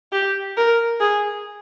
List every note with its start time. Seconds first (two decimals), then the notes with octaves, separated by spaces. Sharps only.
0.12 G4
0.56 A#4
1.00 G#4